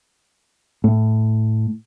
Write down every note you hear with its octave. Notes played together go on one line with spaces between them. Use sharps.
A2